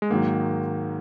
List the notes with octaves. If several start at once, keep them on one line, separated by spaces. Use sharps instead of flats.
G#3
G#2 D#3 F#3 A#3